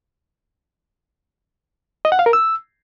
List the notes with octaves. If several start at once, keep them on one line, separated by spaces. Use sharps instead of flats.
D#5
F#5
F5
A#4
E6